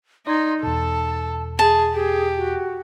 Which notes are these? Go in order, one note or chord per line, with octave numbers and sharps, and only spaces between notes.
D#4 D5 C6 G#6
E2 B2 A4 A5
G#4 A5
G4 G#4
F#4